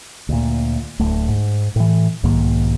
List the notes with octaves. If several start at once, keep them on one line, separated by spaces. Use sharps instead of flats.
D2 A#2
D1 D2 A3
G#2
A2 E3
B1 G#2 D#3 A#3